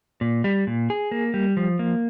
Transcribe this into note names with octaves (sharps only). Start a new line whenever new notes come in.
A#2
G3
A#2
G#4
A#3
G3
F3
A#3